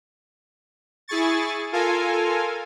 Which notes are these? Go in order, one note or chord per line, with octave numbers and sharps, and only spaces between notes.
E4 G#4 G#5 C#6 A6
F4 A4 A#4 F5 G#5